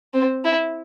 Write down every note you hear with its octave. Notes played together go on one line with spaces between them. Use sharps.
C4
E4